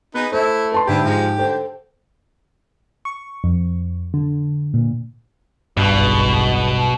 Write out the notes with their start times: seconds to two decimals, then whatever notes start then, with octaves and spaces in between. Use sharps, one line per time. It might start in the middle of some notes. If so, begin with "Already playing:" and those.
0.15 B3 D#4 G#4 B4
0.32 A3 E4 C5
0.72 B4 A5 C6
0.87 G#2 D3 D4 E4 G4 B4
1.04 G#2 F3 G#3
1.37 D3 A4 C5 G5
3.05 C#6
3.44 F2
4.14 D3
4.74 A#2
5.77 F#1 B1 E2 G2 B2